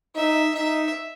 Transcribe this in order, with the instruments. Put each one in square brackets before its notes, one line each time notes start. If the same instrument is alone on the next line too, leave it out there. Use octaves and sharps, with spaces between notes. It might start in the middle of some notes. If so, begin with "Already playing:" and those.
[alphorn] D#4 [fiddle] E5
[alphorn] D#4 [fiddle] E5